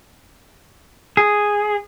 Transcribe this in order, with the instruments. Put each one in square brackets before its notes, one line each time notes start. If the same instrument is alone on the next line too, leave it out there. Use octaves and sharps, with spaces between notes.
[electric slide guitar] G#4